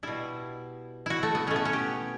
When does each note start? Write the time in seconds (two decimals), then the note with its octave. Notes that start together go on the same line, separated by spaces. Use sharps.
0.03 B2 G3 E4
1.06 E4 F#4
1.23 A3
1.35 B3
1.47 B2 A3 C#4
1.56 B3
1.65 C#4
1.73 G4